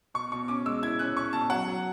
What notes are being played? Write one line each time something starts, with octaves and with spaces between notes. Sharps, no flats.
B2 C#6
B2 C#6
C#4 D6
G#3 E6
E4 G#6
C#4 F#6
C#4 C#6
B2 A5
F#3 F#5
F#3